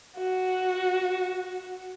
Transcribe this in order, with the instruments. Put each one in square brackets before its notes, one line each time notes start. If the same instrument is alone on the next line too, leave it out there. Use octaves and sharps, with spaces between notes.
[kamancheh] F#4